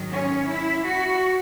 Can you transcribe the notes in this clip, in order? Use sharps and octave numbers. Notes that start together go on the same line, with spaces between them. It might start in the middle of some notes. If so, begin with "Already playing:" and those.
Already playing: G#2 D#3 F#3
C#4
E4
F#4